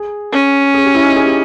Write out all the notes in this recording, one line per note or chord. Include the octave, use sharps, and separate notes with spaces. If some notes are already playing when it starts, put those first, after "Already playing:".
Already playing: G#4
C#4
G#4
G4
E4
D#4
G#4
G4